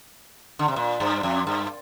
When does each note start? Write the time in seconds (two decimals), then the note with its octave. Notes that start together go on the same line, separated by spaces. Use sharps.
0.59 D3
0.68 C3
0.76 A#2
1.00 G2
1.23 F2
1.47 G2